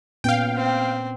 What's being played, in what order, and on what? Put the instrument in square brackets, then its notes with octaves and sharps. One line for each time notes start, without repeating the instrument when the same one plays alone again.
[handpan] A#2 B3 C#4 [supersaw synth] F5 G5
[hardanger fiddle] C4